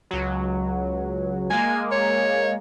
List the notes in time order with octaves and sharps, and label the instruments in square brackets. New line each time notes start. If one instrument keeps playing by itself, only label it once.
[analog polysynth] C#2 F#3
[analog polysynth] G#3 A#3 [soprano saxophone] G#5
[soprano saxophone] C#5